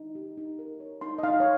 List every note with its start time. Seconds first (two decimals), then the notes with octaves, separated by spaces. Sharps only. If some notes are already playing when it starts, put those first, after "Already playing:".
Already playing: D#4
0.15 G4
0.37 D#4
0.59 A#4
0.80 C#5
1.01 D#4 C6
1.18 D#5
1.23 D#4 F5
1.40 C#5